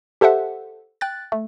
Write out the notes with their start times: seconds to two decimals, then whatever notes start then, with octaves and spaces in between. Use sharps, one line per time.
0.21 G4 A4 C5 E5 F#5
1.01 G5 F#6 A6
1.32 A3